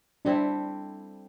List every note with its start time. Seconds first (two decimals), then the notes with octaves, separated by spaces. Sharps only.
0.25 G3 C4 D4 E4 A4